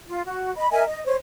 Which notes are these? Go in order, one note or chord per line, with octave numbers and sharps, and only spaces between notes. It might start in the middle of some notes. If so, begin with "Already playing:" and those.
F4
F#4
D#5 B5
A#4 D#5 E5 G#5
D#5
C5 C#5